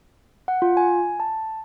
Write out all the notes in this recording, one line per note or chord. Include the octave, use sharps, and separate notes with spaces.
F#5
F4
G#5
A5